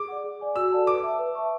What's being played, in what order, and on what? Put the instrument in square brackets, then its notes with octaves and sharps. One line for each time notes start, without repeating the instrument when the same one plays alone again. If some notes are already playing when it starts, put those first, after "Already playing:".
Already playing: [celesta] G#4 [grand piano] D6
[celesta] D5 F#5
G#4
D5 G#5 D6
[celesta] F#4 [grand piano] E6
[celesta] A4 D5 F#5 A5
[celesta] B4 [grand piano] D6
[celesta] E5 A5
B4
E5 A5 C#6